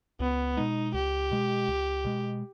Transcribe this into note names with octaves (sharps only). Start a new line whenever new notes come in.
C#2 B3
B2 G#3 D#4
C#2 G4
B2 G#3
C#2
B2 G#3